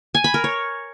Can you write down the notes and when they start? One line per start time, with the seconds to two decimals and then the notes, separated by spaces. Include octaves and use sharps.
0.15 G#5
0.24 B5
0.34 A#4
0.44 C#5